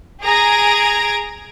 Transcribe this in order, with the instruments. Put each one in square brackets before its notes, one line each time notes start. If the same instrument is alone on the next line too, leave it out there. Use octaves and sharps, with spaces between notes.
[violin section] G#4 A#5 G#6 A#6 D7